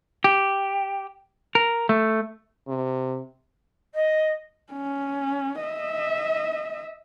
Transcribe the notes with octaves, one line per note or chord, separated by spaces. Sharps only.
G4
A#4
A3
C3
D#5
C#4
D#5 E5